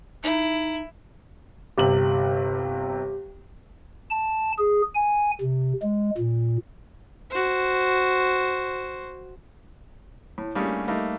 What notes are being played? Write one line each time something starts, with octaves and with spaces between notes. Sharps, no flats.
D#4 E4
G1 C3 G4 F#7
A5
G#4
G#5
C3
G#3
A#2
F#4 C5
A2
G3 A3 A#3 C#4 D4 G#4
G3 A3 A#3 D#4